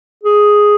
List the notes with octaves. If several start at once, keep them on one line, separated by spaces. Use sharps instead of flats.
G#4